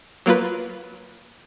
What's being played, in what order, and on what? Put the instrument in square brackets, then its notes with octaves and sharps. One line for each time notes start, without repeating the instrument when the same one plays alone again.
[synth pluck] F#3 A#3 F4 B4